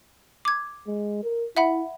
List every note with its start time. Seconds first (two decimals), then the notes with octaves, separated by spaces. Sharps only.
0.45 D6 G#6
0.87 G#3
1.23 A#4
1.57 E4 E5 F#5 B5